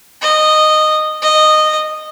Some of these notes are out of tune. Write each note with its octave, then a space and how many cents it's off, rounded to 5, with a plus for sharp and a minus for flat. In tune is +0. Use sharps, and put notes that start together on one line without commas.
D#5 -15
D#5 -15